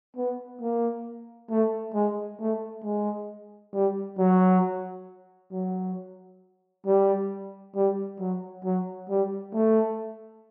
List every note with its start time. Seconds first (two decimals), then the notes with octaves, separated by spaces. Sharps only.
0.17 B3
0.61 A#3
1.50 A3
1.94 G#3
2.40 A3
2.84 G#3
3.74 G3
4.18 F#3
5.52 F#3
6.86 G3
7.76 G3
8.20 F#3
8.64 F#3
9.09 G3
9.54 A3